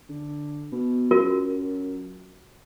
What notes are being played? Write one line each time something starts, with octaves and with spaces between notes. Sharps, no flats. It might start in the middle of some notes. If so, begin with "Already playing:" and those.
D3
B2
F#2 F4 F#4 A#4